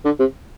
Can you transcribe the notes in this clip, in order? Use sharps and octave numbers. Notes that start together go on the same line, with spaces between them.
D3
C3